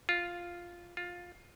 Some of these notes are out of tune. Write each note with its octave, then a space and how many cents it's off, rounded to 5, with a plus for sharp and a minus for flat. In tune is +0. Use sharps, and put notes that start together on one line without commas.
F4 +0
F4 +15